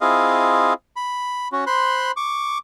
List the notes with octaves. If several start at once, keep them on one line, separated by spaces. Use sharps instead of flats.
C4 E4 F4 G#4 D#5 F5
B5
C#4 F#4
C5 B5 C6 F#6
C#6 D6